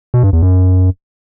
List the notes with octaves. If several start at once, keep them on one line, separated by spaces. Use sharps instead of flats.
B2
G2
E2
F#2